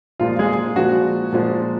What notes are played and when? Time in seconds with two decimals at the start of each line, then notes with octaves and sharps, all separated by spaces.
0.20 A#2 F3 G#3 F4
0.39 G#3 G#4
0.76 A#2 F3 G#3 F#4
1.32 A#2 F3 G#3